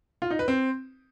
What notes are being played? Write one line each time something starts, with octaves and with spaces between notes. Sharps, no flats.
F4
D#4
B4
C4